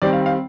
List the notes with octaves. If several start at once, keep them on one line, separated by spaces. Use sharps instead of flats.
D#3 G3 C4 D5
F5
F5